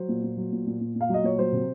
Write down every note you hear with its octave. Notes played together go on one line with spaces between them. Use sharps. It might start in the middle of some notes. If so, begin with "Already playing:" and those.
Already playing: F#3 C5
A#2
A#2
F#3
A#2
A#2
A#2
A#2
F5
F#3 D#5
A#2 C#5
F#3 C5
C3